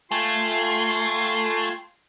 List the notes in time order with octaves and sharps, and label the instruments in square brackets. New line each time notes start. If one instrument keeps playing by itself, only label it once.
[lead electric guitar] A3 [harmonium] F4 G5 G#5 [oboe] C6